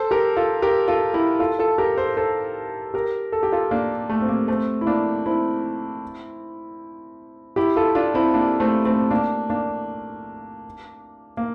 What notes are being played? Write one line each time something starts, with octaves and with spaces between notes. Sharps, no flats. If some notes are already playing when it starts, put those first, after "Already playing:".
Already playing: A4 C5
G4 A#4
F4 A4
G4 A#4
F4 A4
E4 G4
F4 A4
F4 A4
G4 A#4
A4 C5
A4 C5
G4 A#4
A4
G4
F4 A4
A#3 D4
A3
C4
A#3
A3 C4
E4
A#3 D4
C4 E4
E4 G4
F4 A4
D4 F4
C4 E4
A#3 D4
A3 C4
A3 C4
A#3 D4
A#3 D4
A#3